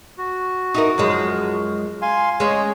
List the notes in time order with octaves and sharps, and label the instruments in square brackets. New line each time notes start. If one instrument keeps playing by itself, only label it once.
[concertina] F#4
[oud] D#4 E4 A#4
F#2 F3 G#3
[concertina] F5 G#5 C6
[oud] G#3 C#4 [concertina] C#5 D#5